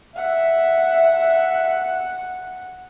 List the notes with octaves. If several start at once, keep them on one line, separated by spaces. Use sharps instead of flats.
E5 F#5